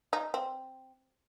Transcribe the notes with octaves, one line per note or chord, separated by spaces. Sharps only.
D#4
C4